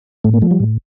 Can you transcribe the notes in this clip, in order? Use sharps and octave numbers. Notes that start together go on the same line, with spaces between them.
A2 A3
A#3
F3 A3
G3
A2